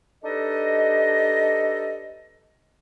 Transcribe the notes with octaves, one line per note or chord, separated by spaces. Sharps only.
D4 D#4 G4 A4 B4 D#5